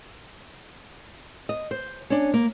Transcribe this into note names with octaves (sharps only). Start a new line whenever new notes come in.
D#5
C5
C#4 D4
A#3